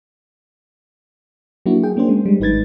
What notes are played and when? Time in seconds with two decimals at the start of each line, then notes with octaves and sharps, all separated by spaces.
1.66 F#3 A#3 D4 E4 F#4
1.83 G#4 G5
1.97 A#3 C#4 D4 C5
2.09 G#3
2.26 G3 G#3
2.40 G#1 D#4 B4 G#6 A6